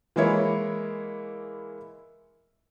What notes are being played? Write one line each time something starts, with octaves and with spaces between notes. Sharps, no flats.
E3 G#3 A#3 E4 C#5